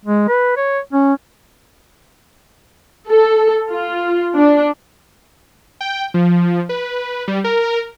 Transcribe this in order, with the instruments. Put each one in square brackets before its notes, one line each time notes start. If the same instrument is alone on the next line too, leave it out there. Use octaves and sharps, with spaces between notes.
[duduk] G#3
B4
C#5
C#4
[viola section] A4
F4
D4
[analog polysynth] G5
F3
B4
G3
A#4